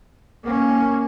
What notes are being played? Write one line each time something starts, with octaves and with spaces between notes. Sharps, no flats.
A#3 C#4